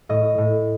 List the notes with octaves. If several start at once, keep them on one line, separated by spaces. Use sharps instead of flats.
A2 D#5
A2